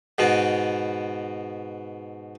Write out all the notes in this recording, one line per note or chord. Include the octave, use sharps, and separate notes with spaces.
G#2 B2 B3